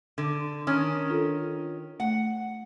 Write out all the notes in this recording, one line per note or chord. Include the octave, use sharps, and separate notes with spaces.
D3
D#3 C#4 D#6 F6
D4 F4 A4
A3 F#5